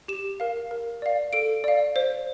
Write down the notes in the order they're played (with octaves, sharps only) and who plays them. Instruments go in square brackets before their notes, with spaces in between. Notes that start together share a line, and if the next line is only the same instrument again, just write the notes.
[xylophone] G4 E7
A#4 F5
A#4
D5 F5
A4 D7
D5 F5
C5